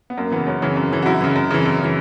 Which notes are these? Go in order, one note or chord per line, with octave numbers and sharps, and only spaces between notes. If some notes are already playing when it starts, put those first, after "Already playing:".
B3
F#2 A#3
C#3 E3 B3
F#2 C#4
C#3 E3
F#2
C#3 E3
F#4
F#2 E4
C#3 E3
F#2
C#3 E3
F#2
C#3 E3